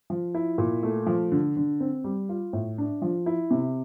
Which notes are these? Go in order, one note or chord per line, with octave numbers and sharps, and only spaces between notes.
F3
E4
A#2
A3
F3
D3
D3
C4
G3
F4
A2
D4
F3
E4
C3